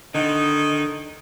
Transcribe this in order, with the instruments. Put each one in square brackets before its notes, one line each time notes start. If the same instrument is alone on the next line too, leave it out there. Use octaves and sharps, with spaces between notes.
[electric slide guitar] D3 [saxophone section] D#3 D#4